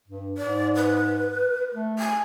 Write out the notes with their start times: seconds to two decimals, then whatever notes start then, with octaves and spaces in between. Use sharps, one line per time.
0.08 G2
0.38 G#2 D5
0.75 B4
1.73 A3
1.99 G#5